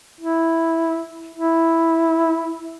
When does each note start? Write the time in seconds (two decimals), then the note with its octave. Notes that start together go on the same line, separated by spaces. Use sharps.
0.21 E4
1.35 E4